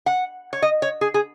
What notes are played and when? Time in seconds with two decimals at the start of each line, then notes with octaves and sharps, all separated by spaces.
0.06 F#5
0.53 C#5
0.62 D#5
0.82 C#5
1.01 G#4
1.14 G#4